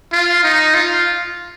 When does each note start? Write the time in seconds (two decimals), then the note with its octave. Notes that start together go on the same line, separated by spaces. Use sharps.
0.12 F4
0.44 D#4
0.74 F4